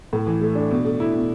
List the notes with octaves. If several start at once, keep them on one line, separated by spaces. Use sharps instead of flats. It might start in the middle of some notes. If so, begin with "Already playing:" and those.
A2
E3
A3
D4
B2
A3
E4
B2